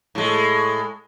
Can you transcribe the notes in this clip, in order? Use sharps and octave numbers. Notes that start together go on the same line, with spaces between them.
A2 G#3